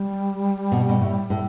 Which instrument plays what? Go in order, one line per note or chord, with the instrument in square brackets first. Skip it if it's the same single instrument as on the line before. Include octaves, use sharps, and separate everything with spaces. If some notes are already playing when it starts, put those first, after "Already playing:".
Already playing: [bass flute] G3
[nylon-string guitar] B2
B2
A2
A2